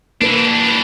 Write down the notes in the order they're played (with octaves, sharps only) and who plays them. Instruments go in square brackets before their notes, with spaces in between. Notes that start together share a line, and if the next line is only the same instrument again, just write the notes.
[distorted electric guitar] E3 D4 [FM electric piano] A#3 B4